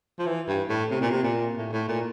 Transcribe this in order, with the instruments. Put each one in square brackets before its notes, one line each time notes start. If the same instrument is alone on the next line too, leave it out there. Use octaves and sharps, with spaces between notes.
[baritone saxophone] F3
E3
G2
A2
C3
A#2
C3
A#2
A2
A2
A#2